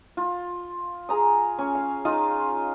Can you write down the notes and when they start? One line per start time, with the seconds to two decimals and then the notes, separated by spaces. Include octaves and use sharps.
0.17 F4
1.09 G#4 A#5 D#6
1.59 C#4
1.75 F5
2.05 D#4 F4 D#5 F5